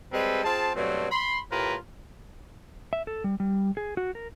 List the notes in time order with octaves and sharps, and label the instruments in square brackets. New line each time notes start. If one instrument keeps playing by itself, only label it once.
[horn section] G3 G#3 C4 A4 B4
C4 F4 G#4 A5
G2 B2 F#3 A3 C4
B5 C6
A2 F4 G4 A#4 B4
[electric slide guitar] E5
A4
G3
G3
G#4
F#4
A#4